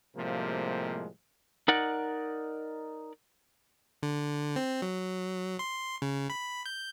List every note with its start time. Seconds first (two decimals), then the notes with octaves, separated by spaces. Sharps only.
0.17 A2 C3 F3 G3 G#3 A#3
1.68 D#4 A#4 D5 F#5
4.03 D3
4.56 C4
4.82 F#3
5.59 C6
6.02 C#3
6.30 B5
6.66 G6